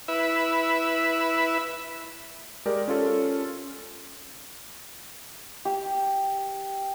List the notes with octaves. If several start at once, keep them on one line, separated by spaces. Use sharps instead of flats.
E4 B4 E5
G#3 G4 A#4 D5
C#4 F4 A4
G4